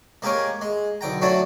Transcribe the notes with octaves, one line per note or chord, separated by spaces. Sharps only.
G#3 A#3 G4 G#4 A#4 C#5
G#3
B1 D3 G5 A#5
F#3 A3 D4 F#4 C#5 D5